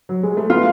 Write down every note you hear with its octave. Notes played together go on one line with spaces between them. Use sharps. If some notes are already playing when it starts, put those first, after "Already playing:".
F#3
G#3
A3
B3 F4